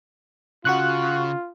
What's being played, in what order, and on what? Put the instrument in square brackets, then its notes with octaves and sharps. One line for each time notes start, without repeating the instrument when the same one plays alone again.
[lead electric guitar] C#3 [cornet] F4 [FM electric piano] F#4 C#6 F#6